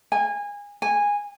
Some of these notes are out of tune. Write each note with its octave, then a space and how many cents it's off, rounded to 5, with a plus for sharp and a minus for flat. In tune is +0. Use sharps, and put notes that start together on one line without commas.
G#5 -25
G#5 -15